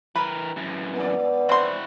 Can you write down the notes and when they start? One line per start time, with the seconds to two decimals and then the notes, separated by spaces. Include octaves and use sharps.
0.16 E3 A#4 B4
0.57 F#2 E3
0.95 G2 B3 D5
1.49 C4 E4 F#4 C6